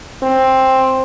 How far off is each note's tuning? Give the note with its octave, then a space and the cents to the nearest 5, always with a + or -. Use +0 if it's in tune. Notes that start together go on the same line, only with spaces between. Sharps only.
C4 +10